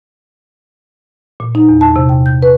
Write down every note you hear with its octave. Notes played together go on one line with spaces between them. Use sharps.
A#2
D#4
E2
A5
C3
G5
G6
B4